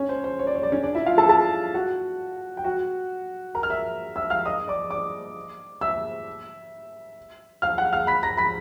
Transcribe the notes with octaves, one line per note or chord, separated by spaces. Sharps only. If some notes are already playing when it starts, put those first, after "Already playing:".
Already playing: C#4 C#5
C5
C5
C#5
D5
C#5
D5
C#4 C#5
D4 D5
E4 E5
F4 F5
A4 A5
A4 A5
F#4 F#5
G5
F#4 F#5
A#4 A#5
F6
E5 E6
E5 E6
F5 F6
D#5 D#6
D5 D6
D5 D6
E5 E6
F5 F6
F#5 F#6
F5 F6
B5 B6
A#5 A#6
B5 B6